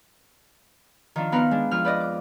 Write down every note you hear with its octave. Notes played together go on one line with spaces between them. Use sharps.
D#3 F3 D4
B3 C4 D#4 A#4 B4 F5
G#3 D4
F2 F3 F6
B4 D5 D#5
D6